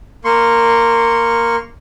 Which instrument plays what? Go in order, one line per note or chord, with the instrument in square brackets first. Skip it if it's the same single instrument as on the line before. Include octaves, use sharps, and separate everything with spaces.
[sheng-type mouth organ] A#3 C6 C#6